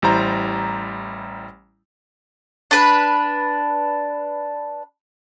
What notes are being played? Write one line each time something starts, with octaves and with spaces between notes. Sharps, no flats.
A1 G3 E4 C5 A#5
D4 B4